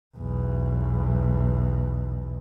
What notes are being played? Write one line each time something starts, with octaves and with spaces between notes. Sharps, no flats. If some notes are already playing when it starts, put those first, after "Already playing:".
B1 E2